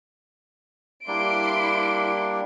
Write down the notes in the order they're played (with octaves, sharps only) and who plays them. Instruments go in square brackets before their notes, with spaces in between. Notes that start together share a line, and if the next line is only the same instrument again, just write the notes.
[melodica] G3 A#3 D4 [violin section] E4 C6 D7